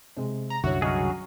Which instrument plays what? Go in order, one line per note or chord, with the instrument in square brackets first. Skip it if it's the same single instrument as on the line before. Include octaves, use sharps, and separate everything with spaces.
[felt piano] C3 G#3
[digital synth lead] A#5
[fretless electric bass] C2 F#2 D3 [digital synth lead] F#4 [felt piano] C#5 E5
[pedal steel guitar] C#3 F#3 G#4 [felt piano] D#5 F6